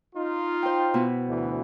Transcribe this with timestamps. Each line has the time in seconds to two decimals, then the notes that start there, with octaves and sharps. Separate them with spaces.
0.15 D#4 F4
0.63 C5 G5
0.94 B2 B3 E4
1.28 D2 E3